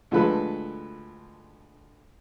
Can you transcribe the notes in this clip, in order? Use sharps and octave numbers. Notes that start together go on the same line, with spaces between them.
D2 F3 G#3 A4 B4